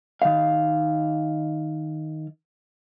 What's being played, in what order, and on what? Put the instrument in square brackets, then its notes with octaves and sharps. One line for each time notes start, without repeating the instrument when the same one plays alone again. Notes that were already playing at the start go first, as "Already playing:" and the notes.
[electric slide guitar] D#3 F5